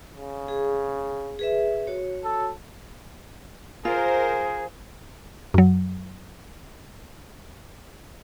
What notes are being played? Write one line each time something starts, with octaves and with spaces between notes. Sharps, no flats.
C#3
G#4
G#4 B4 E5
F#4 C#5
A4
F4 G#4 A#4 C5
F#2 F#3